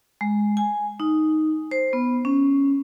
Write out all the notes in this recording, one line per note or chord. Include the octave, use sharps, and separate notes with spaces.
G#3
G#5
D#4
C5
B3
C#4